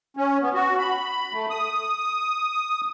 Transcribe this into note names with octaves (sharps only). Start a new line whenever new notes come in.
C#4
B3
F#4
B5
A3
D#6